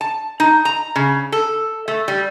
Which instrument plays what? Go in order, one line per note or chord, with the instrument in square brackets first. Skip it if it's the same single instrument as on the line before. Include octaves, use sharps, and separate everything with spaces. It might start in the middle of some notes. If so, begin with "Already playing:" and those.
[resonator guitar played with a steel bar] A5
D#4
A#5
C#3
A4
A3
G3